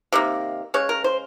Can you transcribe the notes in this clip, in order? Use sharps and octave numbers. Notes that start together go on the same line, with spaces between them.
C3 D#3 A#3
C#3 G#3 C#5
A#4
C5